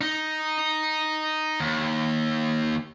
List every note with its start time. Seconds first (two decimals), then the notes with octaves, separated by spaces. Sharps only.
0.01 D#4
1.60 D#2